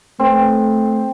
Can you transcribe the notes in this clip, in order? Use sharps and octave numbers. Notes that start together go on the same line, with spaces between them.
A3 C4